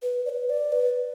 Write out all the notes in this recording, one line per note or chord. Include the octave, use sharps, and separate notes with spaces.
B4
D5
B4
D5
B4